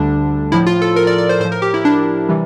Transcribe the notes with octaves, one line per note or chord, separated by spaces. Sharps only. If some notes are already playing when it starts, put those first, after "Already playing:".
Already playing: D2 D3 G3 D4
A2 F3 E4
F4
A4
A#4
D5
D5
C5
A2 C5
F3
A#4
G4
E4
D4
C3 E3 G3